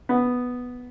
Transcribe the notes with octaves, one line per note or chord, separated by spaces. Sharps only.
B3